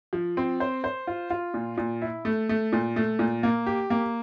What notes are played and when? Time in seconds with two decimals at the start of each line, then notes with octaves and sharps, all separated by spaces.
0.13 F3
0.37 C4
0.60 C5
0.84 C5
1.07 F4
1.30 F4
1.54 A#2
1.77 A#2
2.02 E4
2.25 A3
2.49 A3
2.72 A#2
2.96 A3
3.19 A#2
3.43 A#3
3.67 G4
3.90 A#3